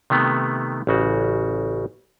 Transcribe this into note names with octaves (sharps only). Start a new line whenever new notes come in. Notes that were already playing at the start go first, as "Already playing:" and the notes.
C3 D#3 A3 B3
A1 C#3 F#4